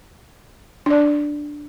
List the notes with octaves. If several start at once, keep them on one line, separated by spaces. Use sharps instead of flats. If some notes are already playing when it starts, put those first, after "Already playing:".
D4 D5